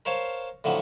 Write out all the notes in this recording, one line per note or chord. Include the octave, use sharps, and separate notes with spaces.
A#4 C5 C#5 F5 A5
A2 D3 F3 F#3